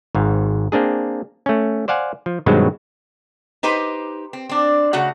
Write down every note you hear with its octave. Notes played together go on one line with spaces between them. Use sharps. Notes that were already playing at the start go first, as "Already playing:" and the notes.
G#1 G#2
A#3 C4 D4 G#4
A3 C#4
C5 D5 F5 F#5 G#5
F3
G2 B2 D#3 F#3 G#3 C4
D#4 G4 B4 C5
C4
C4 D4
C#3 A3 F#4 F#5